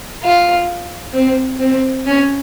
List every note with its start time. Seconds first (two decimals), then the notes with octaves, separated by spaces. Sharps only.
0.23 F4
1.13 C4
1.59 C4
2.06 C#4